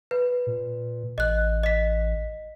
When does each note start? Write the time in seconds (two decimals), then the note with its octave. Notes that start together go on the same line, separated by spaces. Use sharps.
0.11 B4
0.47 A#2
1.18 A1 D#5 F#6
1.63 D#5 B6